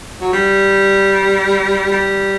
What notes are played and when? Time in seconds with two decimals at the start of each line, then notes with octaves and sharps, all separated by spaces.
0.21 F#3
0.33 G3
1.92 G3